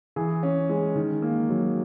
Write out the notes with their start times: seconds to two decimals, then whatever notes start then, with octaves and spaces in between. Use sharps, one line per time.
0.16 E3 G#4
0.43 C#4
0.70 G#3
0.95 D#3
1.22 A#3
1.49 F#3